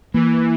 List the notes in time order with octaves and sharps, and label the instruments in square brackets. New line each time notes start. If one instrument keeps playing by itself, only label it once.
[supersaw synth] E3 [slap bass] A#3